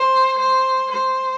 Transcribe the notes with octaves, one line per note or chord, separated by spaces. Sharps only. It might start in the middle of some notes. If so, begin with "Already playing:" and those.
Already playing: C5
C5
C5